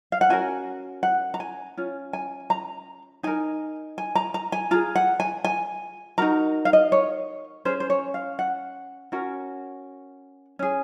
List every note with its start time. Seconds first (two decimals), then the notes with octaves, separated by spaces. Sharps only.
0.12 F5
0.21 F#5
0.29 C#4 F#4 A#4 G#5
1.03 F#5
1.34 A#5
1.40 G#5
1.77 C#4 F4
2.13 G#5
2.50 A#5
3.23 D#4 A#4 G#5
3.98 G#5
4.15 A#5
4.34 A#5
4.52 G#5
4.71 F4 G#4 A#5
4.95 F#5
5.20 G#5
5.44 G#5
6.18 D#4 F#4 A#4 A#5
6.65 F5
6.73 D#5
6.92 C#5
7.65 C#4 G#4 C5
7.80 C5
7.90 C#5
8.14 F5
8.39 F#5
9.12 C#4 F#4 A#4
10.59 C#4 G#4